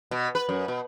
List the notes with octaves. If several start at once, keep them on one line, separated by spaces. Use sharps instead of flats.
B2
B4
F#2
B2